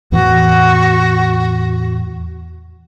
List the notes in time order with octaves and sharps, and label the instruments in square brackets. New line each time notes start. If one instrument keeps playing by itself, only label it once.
[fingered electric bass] E2 A2 E3 [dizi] F#4